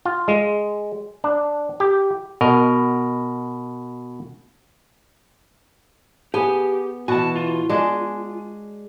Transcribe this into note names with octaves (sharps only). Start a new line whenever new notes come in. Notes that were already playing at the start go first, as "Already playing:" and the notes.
F4
G#3
D4
G4
B2 A#4 D#5
B3 G4 G#4 G#5
B2 E3 F#4 G#5 A5
F4
G#3 D4 G#5